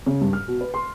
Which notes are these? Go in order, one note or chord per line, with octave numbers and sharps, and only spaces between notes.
C#3
G2
F6
B2
B4
C6